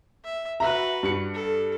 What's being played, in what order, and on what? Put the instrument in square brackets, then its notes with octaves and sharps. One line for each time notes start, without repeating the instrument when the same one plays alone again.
[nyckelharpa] E5
[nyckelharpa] F#4 B4 [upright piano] E5 A#5
[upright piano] G2 C#7
[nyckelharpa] A4